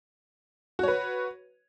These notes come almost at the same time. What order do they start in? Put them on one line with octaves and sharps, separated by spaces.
F#4 C#5 B4